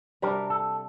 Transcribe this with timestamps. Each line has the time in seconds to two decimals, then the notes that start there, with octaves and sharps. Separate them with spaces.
0.22 C3 G3 D4 G4 A#4
0.50 A4